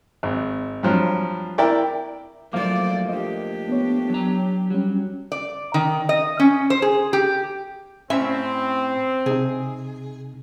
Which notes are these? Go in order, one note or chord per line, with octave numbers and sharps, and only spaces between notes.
G#1
G2 F3 F#3
E4 A#4 D5 G5 D6
F3 F#3 A3 A#3 C5 D5 F5 D6
D4 G4 D#5
B3 C#5
F#3 A#5
F#3 G3 C#4
D5
D#3
D#5
C#4
C5
G#4
G4
A2 C4 C#4 E5
C3 D#4 G#4